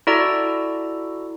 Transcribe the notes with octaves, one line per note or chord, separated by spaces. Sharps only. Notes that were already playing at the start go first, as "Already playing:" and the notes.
E4 F#4 A4 D5 A#5